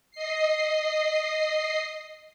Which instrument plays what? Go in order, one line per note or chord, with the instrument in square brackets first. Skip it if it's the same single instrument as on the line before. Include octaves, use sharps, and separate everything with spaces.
[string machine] D#5 C7